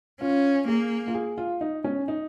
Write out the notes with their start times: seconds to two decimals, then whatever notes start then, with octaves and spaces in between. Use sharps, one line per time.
0.21 C#4 F4
0.68 A#3 G#4
1.08 F4
1.14 G#4
1.38 F4
1.61 D#4
1.84 C#4
2.08 D#4